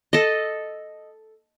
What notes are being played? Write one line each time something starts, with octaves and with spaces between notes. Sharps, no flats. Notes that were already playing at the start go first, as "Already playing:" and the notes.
A4 D#5